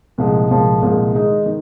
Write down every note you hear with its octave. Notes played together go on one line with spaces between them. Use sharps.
C2 A#2 F3 G#3
C2 A#2 F3 G#3
C2 A#2 F3 G#3
D#3 G#3 D#4
D#3